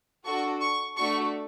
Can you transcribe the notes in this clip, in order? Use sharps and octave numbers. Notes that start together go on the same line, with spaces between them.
D4 F#4 A4 C#6
C#6
A3 D4 F#4 A4 C#6